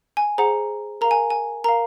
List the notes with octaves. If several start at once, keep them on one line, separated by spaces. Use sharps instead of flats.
G#5
G#4 C5 F#5 A#5
A#4 F5 A#5
G#5
G#5
A#4 F5 A#5